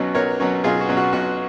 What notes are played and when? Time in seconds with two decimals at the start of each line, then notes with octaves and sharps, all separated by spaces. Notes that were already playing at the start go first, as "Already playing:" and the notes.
Already playing: B1 B2 F#3 C#4
0.15 B1 A#4 C#5
0.40 B2 F#3 C#4
0.64 B1 F4 G#4
0.80 F#4
0.89 B2 F#3 C#4
0.97 F#4
1.13 B1 F#4